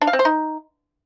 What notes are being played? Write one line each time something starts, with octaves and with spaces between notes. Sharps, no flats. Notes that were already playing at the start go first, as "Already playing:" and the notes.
D4
F5
C4
C5
D#4